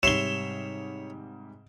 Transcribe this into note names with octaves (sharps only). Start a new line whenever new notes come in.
G#2 C3 G3 C#5 E5 C6 E7 G7